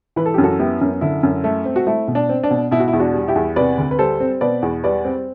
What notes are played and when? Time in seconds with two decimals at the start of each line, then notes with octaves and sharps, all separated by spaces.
0.16 E3 B4
0.26 A4
0.34 G4
0.38 F#2
0.43 F#4 A4
0.59 B3 E4 G4
0.81 F#2
1.01 D3 E4
1.23 F#2
1.44 A3
1.65 C4
1.76 F#4
1.87 A3 E4
2.08 B2
2.15 D4
2.29 C4
2.43 D4
2.50 B2
2.71 B2 E4
2.80 F#4
2.88 E4
2.93 E2
3.00 D4 F#4
3.14 G3
3.28 E4 G4
3.36 E2
3.56 C3 B4 D5
3.78 D2
3.91 B4
3.99 G3 A4 C5
4.20 C4
4.41 B2 B4 D5
4.62 E2
4.83 G3 B4 D5
5.05 C4